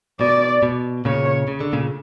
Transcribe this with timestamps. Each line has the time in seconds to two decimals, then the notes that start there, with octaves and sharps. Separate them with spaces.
0.21 B2 D5
0.63 B2
1.05 A#2 C#3 C#5
1.48 C#3
1.60 D3
1.73 A#2 C#3